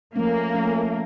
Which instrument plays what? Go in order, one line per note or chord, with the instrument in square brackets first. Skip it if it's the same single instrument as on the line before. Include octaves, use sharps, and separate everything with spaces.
[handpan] F3 A3 C#4 [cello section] A#3
[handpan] F3 A3 C#4